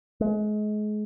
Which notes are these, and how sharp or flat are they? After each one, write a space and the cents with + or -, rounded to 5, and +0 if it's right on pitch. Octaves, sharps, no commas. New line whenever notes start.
G#3 +30